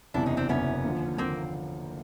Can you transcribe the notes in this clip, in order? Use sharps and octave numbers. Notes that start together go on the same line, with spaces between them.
F#1 E2 C3 E3 D4 E4
C#4 D#4
C4 D4
F#1 E2 C3 E3 B3 C#4
D#2 D3 F3
D3 F3 A#3 C4